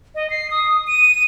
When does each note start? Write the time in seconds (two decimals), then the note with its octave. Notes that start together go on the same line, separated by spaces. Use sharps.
0.15 D#5
0.30 C7
0.51 D#6
0.87 D#7